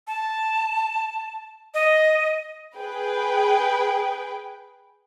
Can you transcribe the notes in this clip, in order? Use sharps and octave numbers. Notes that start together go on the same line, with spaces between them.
A5
D#5
G#4 B4 G5